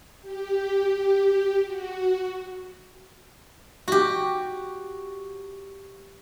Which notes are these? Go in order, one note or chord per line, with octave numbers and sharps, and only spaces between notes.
G4
F#4
F#4 G4